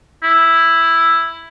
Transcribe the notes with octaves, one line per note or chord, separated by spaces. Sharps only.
E4